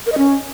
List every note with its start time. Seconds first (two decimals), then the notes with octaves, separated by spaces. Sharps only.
0.06 A#4
0.12 D#5
0.18 C#4